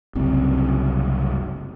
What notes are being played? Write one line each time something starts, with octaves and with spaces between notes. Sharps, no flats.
F#1 C2 C4